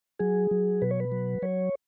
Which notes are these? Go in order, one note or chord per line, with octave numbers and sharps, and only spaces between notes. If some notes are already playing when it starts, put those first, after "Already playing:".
F#3 G#4
F#3
B2 B4
C#5
B4
F#3
F#3 C#5